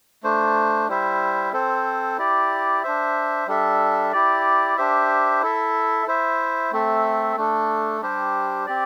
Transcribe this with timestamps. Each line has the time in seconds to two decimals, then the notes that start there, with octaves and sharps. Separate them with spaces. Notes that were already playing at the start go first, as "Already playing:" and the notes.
0.23 A3 D4 C5
0.88 G3 E4 C5 E5
1.53 C4 A4 C5
2.18 E4 G4 D5
2.83 D4 C5 E5
3.47 G3 D4 A4 E5
4.12 E4 G4 D5
4.77 D4 G4 C5 E5
5.42 E4 A4 E5
6.07 E4 C5 E5
6.72 A3 C4 A4 E5
7.37 A3 D4 A4
8.01 G3 D4 G4 C5
8.66 C4 G4 D5